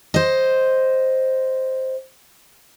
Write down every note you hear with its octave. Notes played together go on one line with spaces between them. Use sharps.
C5 D#5